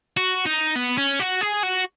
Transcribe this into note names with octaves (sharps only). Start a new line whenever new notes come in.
F#4
D#4
B3
C#4
F#4
G#4
F#4